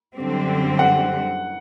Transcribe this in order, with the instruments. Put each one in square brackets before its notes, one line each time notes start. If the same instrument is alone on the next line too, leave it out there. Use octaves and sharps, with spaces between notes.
[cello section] F#2 D3 G3 C4
[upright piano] F#5